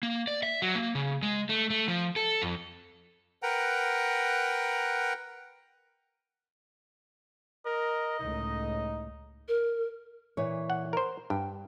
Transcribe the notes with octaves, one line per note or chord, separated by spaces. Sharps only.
A#3
D5
E5
F#3
A#3
C#3
G#3
A3
A3
F3
A4
F2
A#4 B4 F#5 G5 A#5
A#4 D#5
C#2 A2 D#4
A#4
A#2 E3 C#5
F#5
A#4 C5
G2 G5